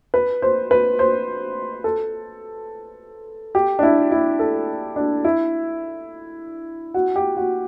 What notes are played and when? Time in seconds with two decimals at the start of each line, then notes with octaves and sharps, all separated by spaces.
0.14 B4
0.42 C5
0.71 B4
0.99 C5
1.84 A4
3.55 G4
3.79 D4
3.83 E4
4.11 E4
4.39 A4
4.96 D4
5.25 E4
6.94 F#4
7.16 G4
7.37 F#4